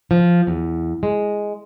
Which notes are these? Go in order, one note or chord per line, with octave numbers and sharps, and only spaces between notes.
F3
E2
G#3